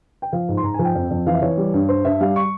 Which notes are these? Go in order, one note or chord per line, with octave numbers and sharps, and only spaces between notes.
G5
F3 F5
G#2
C6
G#2 A#5
F3 G#5
G5
F2
F2
E3 F5
E5
E3 C#5
G3
G2
G2 C5
G2 E5
G3 F5
C#6